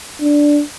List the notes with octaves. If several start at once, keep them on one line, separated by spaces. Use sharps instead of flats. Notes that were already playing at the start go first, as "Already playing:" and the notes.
D4